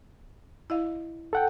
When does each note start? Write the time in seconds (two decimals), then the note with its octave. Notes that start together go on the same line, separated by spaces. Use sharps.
0.70 E4 D#5 F5
1.33 A4 F#5 G5